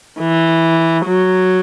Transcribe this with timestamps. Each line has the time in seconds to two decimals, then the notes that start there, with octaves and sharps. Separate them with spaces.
0.20 E3
1.06 F#3